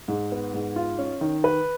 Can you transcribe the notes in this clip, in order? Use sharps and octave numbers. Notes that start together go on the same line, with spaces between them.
G#2
B3
G#2
F4
C#4
D#3
B4